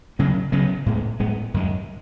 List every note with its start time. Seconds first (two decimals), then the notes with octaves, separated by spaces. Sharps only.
0.19 C#3 F#3 B3
0.52 C#3 F#3 B3
0.86 A2 G#3 B3
1.20 A2 G#3 B3
1.54 F#2 D#3 G#3